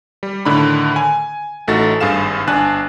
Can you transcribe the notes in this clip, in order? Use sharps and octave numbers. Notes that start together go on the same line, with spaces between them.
G3
A2 D3 D#3 D4 B5
G#5
A1 A3 D#4 F#4 A4 A6
G#1 G2 G#4 F5 E7
G1 D4 G#5 A5 F#6